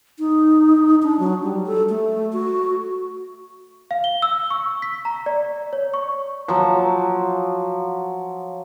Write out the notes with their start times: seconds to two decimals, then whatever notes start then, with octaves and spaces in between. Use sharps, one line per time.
0.19 D#4
1.03 D4
1.20 F#3
1.43 G3
1.67 A4
1.89 A3
2.33 F#4
3.91 F5
4.04 G7
4.22 E6
4.50 C#6
4.82 B6
5.05 A#5
5.26 D5
5.73 C#5
5.94 C#6
6.48 F3 F#3